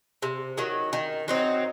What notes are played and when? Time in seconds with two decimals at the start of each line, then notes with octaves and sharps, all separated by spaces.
0.22 C3
0.58 D#3 F#3
0.93 D#3
1.28 F#3 C4 D#4